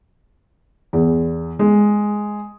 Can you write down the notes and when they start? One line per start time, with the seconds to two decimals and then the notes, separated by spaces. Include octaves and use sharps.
0.93 E2
1.59 G#3